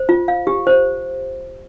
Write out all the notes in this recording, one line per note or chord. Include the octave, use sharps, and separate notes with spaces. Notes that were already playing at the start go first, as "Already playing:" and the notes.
Already playing: C5
F4
F5
G4
C5